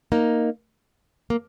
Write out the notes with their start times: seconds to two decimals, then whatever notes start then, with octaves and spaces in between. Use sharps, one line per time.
0.12 A#3 D#4
1.30 A#3